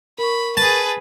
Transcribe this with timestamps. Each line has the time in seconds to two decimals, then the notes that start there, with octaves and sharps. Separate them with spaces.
0.18 A#4 B5 C#6
0.57 G#4 B4 A5